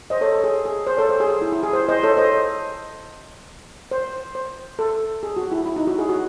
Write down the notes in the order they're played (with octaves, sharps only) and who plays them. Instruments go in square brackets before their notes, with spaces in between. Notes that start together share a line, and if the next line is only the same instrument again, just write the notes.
[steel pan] C5 D#5
A4 C#5
A4
G#4
G#4
C5
A4 C#5
C5
G#4
G#4
E4
E4
G#4
C5
C5 D#5
A4 C#5
C5 D#5
C5
C5
A4
G#4
F#4
E4
E4
D#4
F#4
G#4
F#4